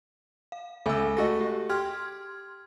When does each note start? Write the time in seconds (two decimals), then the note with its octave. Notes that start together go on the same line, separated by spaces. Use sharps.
0.52 F5
0.86 C#2 A4 E5 G#5 E6
1.17 A3 F#4 D#5 A#6
1.41 G4
1.69 G4 C6 F6 G#6